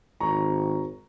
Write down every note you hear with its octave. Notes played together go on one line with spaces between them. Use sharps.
G#1 A#5 C#6